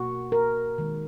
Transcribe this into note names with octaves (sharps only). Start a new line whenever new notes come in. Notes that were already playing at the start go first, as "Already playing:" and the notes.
Already playing: B2 A#3 F#4
A#4
D#3 G#3